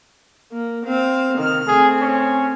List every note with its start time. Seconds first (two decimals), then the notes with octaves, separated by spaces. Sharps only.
0.52 A#3
0.86 C4 F5
1.37 C3 D#3 F6
1.68 A3 C4 G#4
2.01 C#4